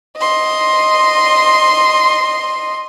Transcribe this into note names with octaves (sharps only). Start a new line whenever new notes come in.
D#5 C6